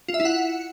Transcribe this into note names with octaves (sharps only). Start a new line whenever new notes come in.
F4
E5
E4
F#5